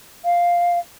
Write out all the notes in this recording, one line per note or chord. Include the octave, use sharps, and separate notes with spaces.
F5